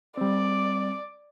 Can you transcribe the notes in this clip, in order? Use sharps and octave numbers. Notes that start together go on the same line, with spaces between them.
G3 C4 D5